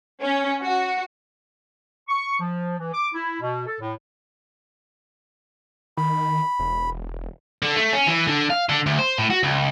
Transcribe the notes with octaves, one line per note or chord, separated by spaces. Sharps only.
C#4
F#4
C#6
F3
E3
D6
E4
B2
A4
A2
D#3 B5
E1
D3
A3
C#4
E3
D3
F5
D3
D2
C5
A2
F#4
C#2